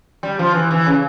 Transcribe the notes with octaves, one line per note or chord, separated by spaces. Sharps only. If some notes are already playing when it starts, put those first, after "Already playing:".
G3
F3
E3
E3
C#3